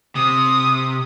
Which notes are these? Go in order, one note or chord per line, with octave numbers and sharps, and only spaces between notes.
C3 D#6